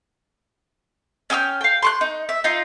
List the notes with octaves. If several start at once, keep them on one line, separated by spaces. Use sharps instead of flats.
C#4 G5 D#6 F6
F5 G5
C6 C#6 F#6
D#4
E5
D#4 F4